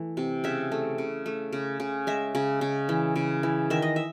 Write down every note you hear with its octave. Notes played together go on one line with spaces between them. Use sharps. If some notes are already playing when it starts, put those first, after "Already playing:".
Already playing: E3 A3
C3
C#3 E5
A3
C#3
A3
C#3
C#3
G#3 E5
C#3
C#3
E3
C#3
E3
D#3 E5
D#5
E5